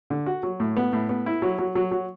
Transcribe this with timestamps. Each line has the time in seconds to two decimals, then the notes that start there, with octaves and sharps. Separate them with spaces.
0.10 D3
0.26 F#4
0.43 F#3
0.60 A2
0.77 B3
0.93 A2
1.09 B3
1.26 E4
1.42 F#3
1.58 F#3
1.75 F#3
1.91 F#3